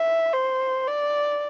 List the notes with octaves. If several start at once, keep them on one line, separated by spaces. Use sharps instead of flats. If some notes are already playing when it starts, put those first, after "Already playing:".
Already playing: E5
C5
D5